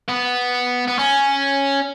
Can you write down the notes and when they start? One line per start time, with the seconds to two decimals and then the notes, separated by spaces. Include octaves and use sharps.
0.08 B3
0.87 B3
0.99 C#4